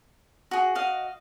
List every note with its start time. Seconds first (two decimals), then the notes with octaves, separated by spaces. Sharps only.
0.51 F#4 G#4
0.75 F#4 D#5 F5